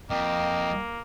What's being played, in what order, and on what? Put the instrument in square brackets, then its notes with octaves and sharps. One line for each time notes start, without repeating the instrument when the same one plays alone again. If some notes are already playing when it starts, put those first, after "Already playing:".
[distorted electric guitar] F2 [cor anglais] A#3 [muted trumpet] D#5 [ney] G5